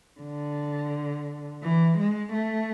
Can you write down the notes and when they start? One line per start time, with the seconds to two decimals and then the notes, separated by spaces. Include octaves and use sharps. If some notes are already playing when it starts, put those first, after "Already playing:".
0.21 D3
1.63 E3
1.98 G#3
2.34 A3